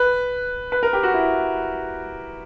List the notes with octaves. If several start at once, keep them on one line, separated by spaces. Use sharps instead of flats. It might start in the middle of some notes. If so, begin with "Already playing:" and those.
Already playing: B4
B4
A#4
G4
F#4
E4